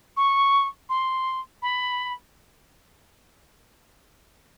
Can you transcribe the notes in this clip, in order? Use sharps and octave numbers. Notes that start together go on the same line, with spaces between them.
C#6
C6
B5